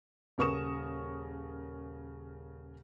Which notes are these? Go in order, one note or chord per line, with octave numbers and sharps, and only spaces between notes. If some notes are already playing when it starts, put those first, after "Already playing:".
D#1 C#3 A#4 C#6 D#6 E7